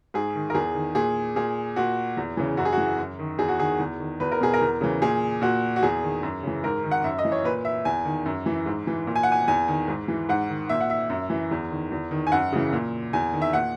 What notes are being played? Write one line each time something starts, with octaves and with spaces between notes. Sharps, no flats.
G#2 G#4
D#3
A#4
E2 G#4
D#3
A#2 G#4
A#2 G#4
A#2 F#4
E2
C#3 E3
F#2 F#4
G#4
F#4
E3
F#2
D#3
E2 G#4
F#4
D#3 G#4
E2
D#3
E2 B4
A#4
B2 G#4
A#4
E2
C#3 E3
A#2 G#4
A#2 F#4
F#4
E2 G#4
D#3
F#2
C#3 E3
G#2 A#4
D#3
F#5
F#2 E5
D#5
E3
C#5
A#2 B4
E5
E2 G#5
D#3
F#2
E3
G#2
E3
A#2
G#5
F#5
G#5
E2 G#5
D#3
G#2
E3
G#2 F#5
D#3
A#2 E5
F#5
E5
F#2
E3
E2
D#3
E2
D#3
G#5
F#2 F#5
C#3 E3
A#2
E2 G#5
D#3
E5
A#2 F#5